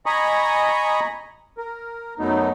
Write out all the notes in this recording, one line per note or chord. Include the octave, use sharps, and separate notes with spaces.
D#5 G#5 A#5 B5 C#6 D#6
A#4
F#2 F#3 A3 B3 D#4